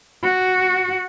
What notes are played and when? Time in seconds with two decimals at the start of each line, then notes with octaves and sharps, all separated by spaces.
0.23 F#4